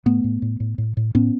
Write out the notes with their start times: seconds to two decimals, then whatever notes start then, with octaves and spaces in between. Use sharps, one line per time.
0.06 A2 A3 B3
0.24 A2
0.42 A2
0.60 A2
0.78 A2
0.97 A2
1.15 A2 B3 C#4